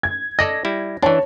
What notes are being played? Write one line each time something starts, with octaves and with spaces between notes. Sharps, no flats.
G#6
A4 D5 D#5 A#6
G3 E4
E3 D4 C#5 A5